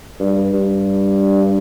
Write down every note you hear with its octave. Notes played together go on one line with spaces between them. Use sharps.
G2
G2